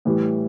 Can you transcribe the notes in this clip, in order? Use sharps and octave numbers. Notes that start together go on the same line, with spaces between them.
A2 E3 G3